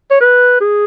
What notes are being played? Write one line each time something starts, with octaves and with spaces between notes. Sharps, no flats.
C#5
B4
G#4